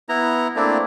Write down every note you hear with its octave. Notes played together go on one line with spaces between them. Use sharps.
B3 E4 A#5
A3 A#3 C4 D4 E4